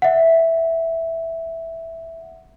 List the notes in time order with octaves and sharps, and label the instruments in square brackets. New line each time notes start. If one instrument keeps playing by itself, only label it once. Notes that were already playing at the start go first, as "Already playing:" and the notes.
[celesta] E5 F#5